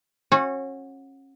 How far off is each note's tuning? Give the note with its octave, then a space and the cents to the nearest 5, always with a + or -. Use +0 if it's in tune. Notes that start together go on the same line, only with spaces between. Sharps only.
C#4 -30 F#4 -15